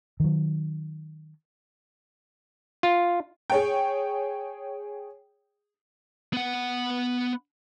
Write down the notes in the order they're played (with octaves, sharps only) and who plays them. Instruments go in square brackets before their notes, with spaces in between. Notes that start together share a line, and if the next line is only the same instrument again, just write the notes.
[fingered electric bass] D#3 F#3
[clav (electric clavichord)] F4
[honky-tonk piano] G#4 C#5 G5
[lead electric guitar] B3 F#5